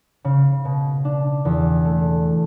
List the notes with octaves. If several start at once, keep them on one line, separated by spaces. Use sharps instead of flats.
C#3
B2
D4
E2
A3